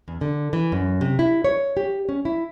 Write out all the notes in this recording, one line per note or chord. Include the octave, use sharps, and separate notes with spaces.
E2
D3
E3
F#2
C3
E4
C#5
G4
C#4
E4